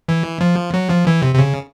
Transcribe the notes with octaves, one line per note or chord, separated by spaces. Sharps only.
E3
F3
F#3
F3
E3
C3
C3
C#3